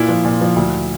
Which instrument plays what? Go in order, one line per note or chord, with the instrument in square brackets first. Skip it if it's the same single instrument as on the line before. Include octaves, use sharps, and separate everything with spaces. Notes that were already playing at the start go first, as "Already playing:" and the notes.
Already playing: [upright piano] A#2 [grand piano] E4 F4
[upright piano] F3
A#2
F3
D2